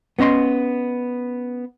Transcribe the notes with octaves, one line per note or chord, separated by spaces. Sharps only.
B3 C#4 D#5 B5 C6